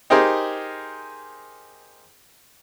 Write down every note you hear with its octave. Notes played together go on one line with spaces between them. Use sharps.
D#4 G4 G#4 A#4 C5